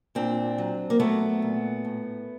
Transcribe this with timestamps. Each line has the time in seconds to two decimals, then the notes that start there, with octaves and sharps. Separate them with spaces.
0.15 A#2 C4 D4
0.58 F#3
0.90 A#3
1.00 F#3 A3 B3
1.42 A#2
1.85 A2